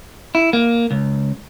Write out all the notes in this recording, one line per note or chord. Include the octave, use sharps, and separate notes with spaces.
E4
A#3
C#2